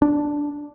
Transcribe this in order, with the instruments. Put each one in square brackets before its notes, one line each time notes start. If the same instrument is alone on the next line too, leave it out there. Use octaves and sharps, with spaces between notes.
[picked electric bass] D4